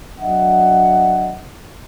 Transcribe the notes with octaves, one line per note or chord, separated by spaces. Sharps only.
F#3 D4 D#5 E5 F#5